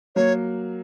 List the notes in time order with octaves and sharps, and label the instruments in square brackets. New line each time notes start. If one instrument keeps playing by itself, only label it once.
[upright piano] F#3 A#3 [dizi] C#5